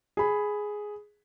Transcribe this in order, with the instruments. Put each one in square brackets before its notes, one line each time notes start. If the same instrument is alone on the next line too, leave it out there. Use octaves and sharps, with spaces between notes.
[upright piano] G#4 B5